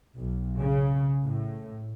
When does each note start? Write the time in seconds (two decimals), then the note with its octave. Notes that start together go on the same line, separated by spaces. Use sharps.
0.16 B1
0.59 C#3
1.24 A2